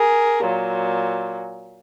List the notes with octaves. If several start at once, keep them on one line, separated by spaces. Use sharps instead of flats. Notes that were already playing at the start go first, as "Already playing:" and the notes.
Already playing: G#4 A#4
A#2 F#3